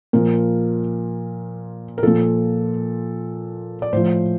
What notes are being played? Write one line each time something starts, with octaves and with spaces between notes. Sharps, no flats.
A#2 F3 A#4
A#4
A#2 F3 A4
D5
A2 F3 C5